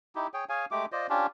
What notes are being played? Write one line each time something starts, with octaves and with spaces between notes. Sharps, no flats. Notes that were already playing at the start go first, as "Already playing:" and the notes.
D#4 E4 G4
G#4 C#5 G5
G#4 C#5 F5 G#5
G#3 A3 G4 D6
F4 C5 D5 D#5
C#4 D4 F4 G4